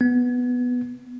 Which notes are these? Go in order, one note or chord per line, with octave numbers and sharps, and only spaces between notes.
B3